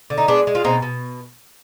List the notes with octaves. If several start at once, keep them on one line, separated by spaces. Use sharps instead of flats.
D3
D#4
G#3 B3 D4
G#3
F4
B2 C4 D#4
B2